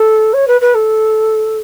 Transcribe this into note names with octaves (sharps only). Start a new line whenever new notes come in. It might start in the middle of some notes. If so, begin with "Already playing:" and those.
Already playing: A4
C#5
B4
B4
A4